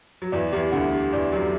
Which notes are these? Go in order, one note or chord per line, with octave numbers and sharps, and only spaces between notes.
F#3
E2 E3 D5
E2 E3 G4
D2 D3 F#5
G4
E2 E3 D5
F#2 F#3 G4